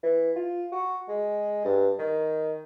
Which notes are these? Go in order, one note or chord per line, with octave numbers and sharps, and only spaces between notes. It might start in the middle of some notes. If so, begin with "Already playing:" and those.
E3
F4
F#4
G#3
G2
D#3